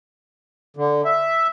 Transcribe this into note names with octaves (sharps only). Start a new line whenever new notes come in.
D3
E5